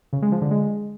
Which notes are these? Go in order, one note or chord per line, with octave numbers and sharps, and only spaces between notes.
C#3
G#3
F3
D3
G#3